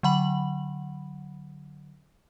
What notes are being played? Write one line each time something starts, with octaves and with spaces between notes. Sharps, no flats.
D3 F#3 F#5 B5 F#7